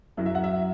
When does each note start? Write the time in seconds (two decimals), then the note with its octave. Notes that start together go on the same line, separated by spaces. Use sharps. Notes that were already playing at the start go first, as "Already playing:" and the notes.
0.17 F#2 F#3 E4
0.26 E5
0.35 F#5
0.44 E5